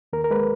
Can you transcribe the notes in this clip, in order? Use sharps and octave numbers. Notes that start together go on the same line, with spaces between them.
D#2 A#4
A#4
G#3 B4